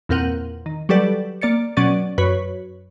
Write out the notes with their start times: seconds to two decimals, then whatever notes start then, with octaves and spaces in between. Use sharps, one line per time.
0.09 E2 A#2 C4 A#4 F#5 D#7
0.66 D#3
0.89 F#3 G3 G4 A4 B4 D5
1.41 A#3 D5 A6 C#7
1.77 B2 F#3 C#4 D5 A6 D#7
2.18 F#2 B4 C#5 B5